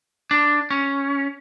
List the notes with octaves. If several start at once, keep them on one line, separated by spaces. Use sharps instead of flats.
D4
C#4